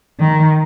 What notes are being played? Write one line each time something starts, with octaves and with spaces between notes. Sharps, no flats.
D#3